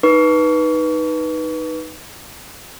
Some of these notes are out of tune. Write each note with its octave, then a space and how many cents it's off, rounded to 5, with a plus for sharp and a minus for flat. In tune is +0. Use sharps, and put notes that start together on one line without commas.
D#4 +0 B4 -10 C#6 +35